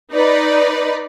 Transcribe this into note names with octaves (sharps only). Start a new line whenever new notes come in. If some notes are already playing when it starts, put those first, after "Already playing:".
D#4 B4 D5